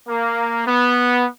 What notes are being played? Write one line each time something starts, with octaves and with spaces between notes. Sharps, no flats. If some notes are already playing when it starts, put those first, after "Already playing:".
A#3
B3